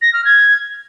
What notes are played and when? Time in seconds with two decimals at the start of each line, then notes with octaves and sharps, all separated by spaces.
0.02 A#6
0.13 F6
0.25 G#6